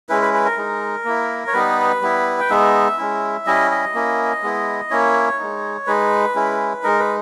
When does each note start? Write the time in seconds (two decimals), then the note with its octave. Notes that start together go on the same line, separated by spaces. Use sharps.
0.09 G#3 C#4 E4 B4
0.22 B4
0.34 B4
0.46 A#4
0.57 G#3 D#4
1.05 A#3 E4
1.47 C#5
1.53 G3 B3 D#4 B4
2.01 G3 B3 E4
2.40 G5
2.50 G#3 B3 D#4 E5
2.98 G#3 C#4 E4
3.46 G3 C#4 E4 D#5
3.71 D#5
3.94 A#3 C#4 E4
4.42 G#3 B3 E4
4.90 A#3 C#4 E4 C#5
5.39 G#3 D#4
5.87 G#3 D#4 B4
6.35 G#3 C#4 E4
6.83 G#3 D#4 A#4
6.99 B4